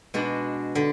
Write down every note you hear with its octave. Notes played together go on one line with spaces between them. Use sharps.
B2 G#3 D4 F#4
D3